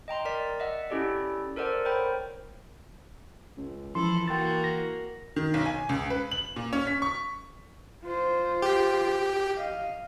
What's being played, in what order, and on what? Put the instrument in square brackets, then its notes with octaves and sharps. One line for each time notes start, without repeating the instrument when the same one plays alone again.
[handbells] D#5 G5 A#5 C6
A#4 D5 B6
D#5 E5 F#5
C#4 E4 G4 A4 D5
A4 A#4 C5 D5 F#5
A#4 C5 C#5 G5 B5
[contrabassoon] C#2
[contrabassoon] E3 [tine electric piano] F3 C6 [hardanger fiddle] E4 A4
[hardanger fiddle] A#3 F#4 [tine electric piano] G5 C6 A6
[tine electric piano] A#6
[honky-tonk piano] D#3
B1
G#5
C#2
B4
F#7
A#2
C#4
B6
C#6
[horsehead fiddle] F4 C5
[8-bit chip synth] G4
[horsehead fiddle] D#5 F5